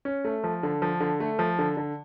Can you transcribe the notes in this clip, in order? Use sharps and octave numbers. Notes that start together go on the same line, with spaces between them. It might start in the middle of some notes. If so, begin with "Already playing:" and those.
C#4
A3
F3
D3
F3
D3
A3
F3
D3
D3